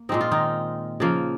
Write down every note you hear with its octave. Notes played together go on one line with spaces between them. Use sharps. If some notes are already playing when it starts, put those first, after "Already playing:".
Already playing: A#3
A#2 G#3 C4 D#4
F4
D#3 D#4
C#3 F3 A#3